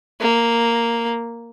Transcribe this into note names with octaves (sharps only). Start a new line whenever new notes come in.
A#3